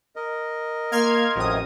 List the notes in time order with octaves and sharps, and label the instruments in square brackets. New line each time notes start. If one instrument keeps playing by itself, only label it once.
[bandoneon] A#4 D#5
[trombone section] A#3 [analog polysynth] C6 F6 G#6
[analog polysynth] A1 D#6 [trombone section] F2 F#3